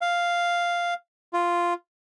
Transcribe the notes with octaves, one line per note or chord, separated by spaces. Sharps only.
F5
F4